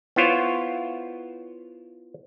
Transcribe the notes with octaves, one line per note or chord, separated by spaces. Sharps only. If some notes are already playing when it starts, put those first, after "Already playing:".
B3 E4 F4 C5 C#5